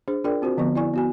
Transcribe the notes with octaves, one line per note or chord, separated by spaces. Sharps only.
D4 G#4 C5
D4 F4 G#4 A#4 D5 G5
C4 F4 F#4 C5
D3 F3 B3 C#6
E4 D5 G#5 C#6
B3 F#4 G#5